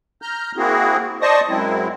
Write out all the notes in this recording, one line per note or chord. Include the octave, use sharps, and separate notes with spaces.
A#5 F6 G6
A#3 C4 E4 F#4 G#4
C5 D5 D#5 A5 C#6 D#6
F#2 F#3 G#3 C4 E4